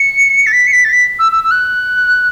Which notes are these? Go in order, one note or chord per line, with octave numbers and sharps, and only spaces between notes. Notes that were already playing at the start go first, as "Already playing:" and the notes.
Already playing: C#7
A6
B6
C#7
B6
A6
B6
E6
E6
E6
F#6